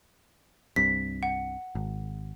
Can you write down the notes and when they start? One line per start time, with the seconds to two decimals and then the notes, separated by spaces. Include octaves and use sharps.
0.76 C2 G2 C3 B6
1.23 F#5
1.75 G#1